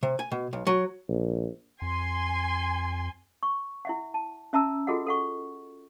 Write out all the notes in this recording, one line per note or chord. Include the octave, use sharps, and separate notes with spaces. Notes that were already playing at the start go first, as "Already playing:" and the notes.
C3
G#5
B2
B1
F#3
A#1
F2 G#5 C6
C#6
E4 E5 F#5
A5
C#4 E5 A5 A#5 E6
F4 F#4 G#4 A4 D#5 F#5
A4 F#5 C#6